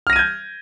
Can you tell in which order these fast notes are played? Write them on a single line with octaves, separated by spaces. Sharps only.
F6 A#6 D#7 G#6 G6